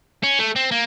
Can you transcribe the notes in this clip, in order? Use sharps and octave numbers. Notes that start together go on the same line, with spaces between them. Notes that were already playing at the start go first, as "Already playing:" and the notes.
C#4
A3
C4
A#3